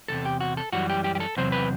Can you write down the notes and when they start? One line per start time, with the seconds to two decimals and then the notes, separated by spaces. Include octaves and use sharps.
0.08 E2 C3 D#3 A4
0.25 G4
0.41 F#4
0.57 A4
0.73 F#2 E3 G3 F#4
0.90 G4
1.04 G4
1.15 G4
1.20 A4
1.37 E2 C3 F#3 C4 C5
1.52 B4